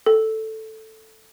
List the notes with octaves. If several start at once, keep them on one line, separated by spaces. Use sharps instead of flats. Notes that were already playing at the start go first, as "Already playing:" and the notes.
A4